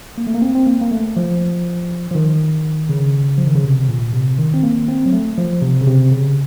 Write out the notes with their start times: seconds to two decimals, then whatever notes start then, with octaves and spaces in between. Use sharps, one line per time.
0.18 A#3
0.27 A3
0.34 A#3
0.42 C4
0.55 C4
0.67 A#3
0.81 A#3
0.91 A3
1.17 F3
2.11 F3
2.15 D#3
2.89 C#3
3.38 F3
3.47 D#3
3.55 C#3
3.64 C3
3.89 A#2
4.14 C3
4.38 D#3
4.54 C4
4.63 A#3
4.88 C4
5.06 F#3
5.13 A3
5.38 F3
5.62 C3
5.81 C#3
5.87 C3
6.11 C#3